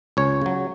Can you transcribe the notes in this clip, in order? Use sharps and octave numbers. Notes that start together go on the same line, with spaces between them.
C#2 C#5
C#3 F#3